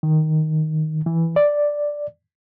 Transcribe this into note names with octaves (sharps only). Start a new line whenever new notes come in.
D#3
E3
D5